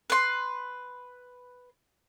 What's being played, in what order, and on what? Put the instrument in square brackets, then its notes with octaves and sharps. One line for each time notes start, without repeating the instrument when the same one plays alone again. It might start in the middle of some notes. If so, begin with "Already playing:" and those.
[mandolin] B4 C6